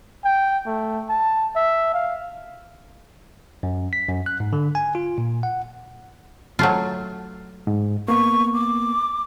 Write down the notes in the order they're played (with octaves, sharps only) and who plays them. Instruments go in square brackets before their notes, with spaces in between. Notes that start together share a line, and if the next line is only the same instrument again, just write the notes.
[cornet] G5
A3
A5
E5
F5
[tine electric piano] F#2
B6
F#2
F#6
G#2
D3
G#5
F4
A#2
F#5
[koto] F#3 A3 F4
[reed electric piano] G#2
[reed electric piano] A#3 B3 [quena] C#6
[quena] D6